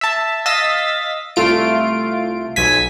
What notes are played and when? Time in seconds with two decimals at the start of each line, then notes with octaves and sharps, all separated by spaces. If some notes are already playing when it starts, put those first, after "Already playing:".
0.01 E5 A5
0.46 D#5 F5 E6 A6 B6
1.36 C2 A3 F4 D7
2.56 B1 G#5 B6